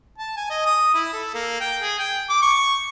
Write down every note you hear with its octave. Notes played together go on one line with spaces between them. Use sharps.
A5
G#5
D#5
D#6
E4
A4
A#3
G5
G#4
G5
D6
C#6